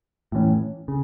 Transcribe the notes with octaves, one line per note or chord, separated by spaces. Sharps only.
A2 E3 C#4
C#3